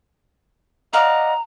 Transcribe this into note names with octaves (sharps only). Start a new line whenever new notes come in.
D5 D#5 F5 F#5 A#5